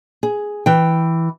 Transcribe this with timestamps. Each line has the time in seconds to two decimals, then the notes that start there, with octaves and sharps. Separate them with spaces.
0.23 G#4
0.66 E3 G5